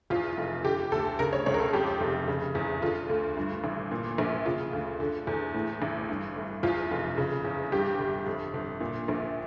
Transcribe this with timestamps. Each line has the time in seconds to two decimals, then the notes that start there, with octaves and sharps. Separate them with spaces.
0.10 E2 F4
0.37 F1
0.65 D3 G4
0.92 D2 A4
1.19 C#3 A#4
1.33 C#5
1.46 C#2 C#5
1.54 A#4
1.60 A4
1.73 F2 G4
2.00 F1
2.28 C#3
2.55 E2
2.82 D3 F4
3.09 D2
3.37 G2
3.64 A1
3.91 A#2
4.18 A#1
4.45 C#3 F4
4.73 D2
5.00 D3
5.27 E2
5.55 A2
5.82 A1
6.09 G2
6.36 G1
6.63 E2 F4
6.91 F1
7.18 C#3
7.45 E2
7.72 G2 G4
7.99 G1
8.27 F2
8.54 G1
8.81 A#2
9.08 A#1